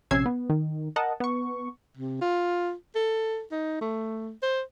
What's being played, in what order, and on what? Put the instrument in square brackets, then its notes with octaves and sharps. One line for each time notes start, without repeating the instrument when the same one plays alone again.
[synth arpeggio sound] A#1 C3 C#4 E6 G#6 C7
B3
D#3
A#4 D#5 F#5 A5
B3 C#6
[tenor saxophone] C3
F4
A4
D#4
A3
C5